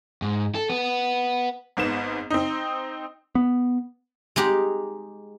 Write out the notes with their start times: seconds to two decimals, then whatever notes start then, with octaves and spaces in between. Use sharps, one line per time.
0.22 G#2
0.55 A4
0.70 B3
1.77 G#1 G#2 B3 E7
2.30 C4 D#4
3.35 B3
4.36 G#3 D#4 G4